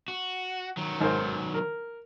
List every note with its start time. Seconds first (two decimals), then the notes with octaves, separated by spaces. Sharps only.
0.08 F#4
0.77 D#3 F#3
1.01 G#1 A#4 C5
1.54 A#4